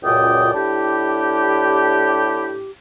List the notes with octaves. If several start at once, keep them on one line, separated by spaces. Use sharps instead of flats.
C#2 F#2 A#2 D5 G5 D#6
A2 D4 E4 G4